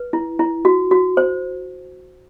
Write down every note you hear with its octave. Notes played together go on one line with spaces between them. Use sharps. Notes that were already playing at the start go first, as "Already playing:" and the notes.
Already playing: B4
E4
E4
F#4
F#4
C5